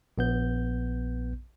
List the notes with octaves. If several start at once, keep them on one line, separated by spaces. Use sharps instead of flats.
A#1 B3 G6